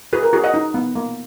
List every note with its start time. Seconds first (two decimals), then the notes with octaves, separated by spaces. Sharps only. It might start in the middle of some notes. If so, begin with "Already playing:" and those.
0.13 F#4 G#4 B4
0.23 A#4
0.33 F#4 G#4
0.44 D#5 F#5
0.54 D#4
0.74 B3
0.96 A#3